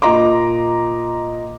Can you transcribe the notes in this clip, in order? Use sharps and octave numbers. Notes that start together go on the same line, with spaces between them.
A#2 D#5 A#5 C6 D6